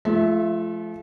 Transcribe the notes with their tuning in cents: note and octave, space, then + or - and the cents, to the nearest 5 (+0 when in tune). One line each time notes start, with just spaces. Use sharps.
F3 -25 A3 -40 E5 +0